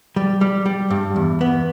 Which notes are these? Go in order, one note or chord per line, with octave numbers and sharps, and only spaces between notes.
G3
G3
G3
G2
E2
B3